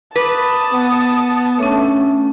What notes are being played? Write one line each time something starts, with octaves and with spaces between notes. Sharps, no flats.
B4 A5 D6 D#6
B3
A3 C#4 D4 C#5